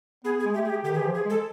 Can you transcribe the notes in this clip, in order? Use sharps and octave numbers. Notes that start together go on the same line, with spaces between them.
B3 G#4
G#4
G#3
A3 G4
G#4
G4
D3 G4
D#3
G#4
E3 G4
F3
G#4
G#3
A4